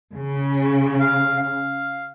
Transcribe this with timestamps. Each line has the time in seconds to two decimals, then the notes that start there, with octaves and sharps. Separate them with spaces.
0.14 C#3
1.00 F5
1.39 F5